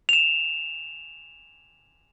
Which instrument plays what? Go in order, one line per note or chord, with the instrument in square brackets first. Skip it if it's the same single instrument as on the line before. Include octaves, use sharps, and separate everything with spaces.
[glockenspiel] E7 F7